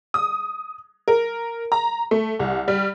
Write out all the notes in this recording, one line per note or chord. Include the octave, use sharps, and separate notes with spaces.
D#6
A#4
A#5
A3
C2
G3